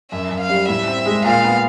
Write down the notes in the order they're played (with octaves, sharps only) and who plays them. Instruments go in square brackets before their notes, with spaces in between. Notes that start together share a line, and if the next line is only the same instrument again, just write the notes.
[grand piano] F#2 [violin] E5
[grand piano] F#2
[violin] F5
[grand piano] G3
[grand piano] A2 [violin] E5
[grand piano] C4
G#3
[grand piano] A#2 [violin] F5
[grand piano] B3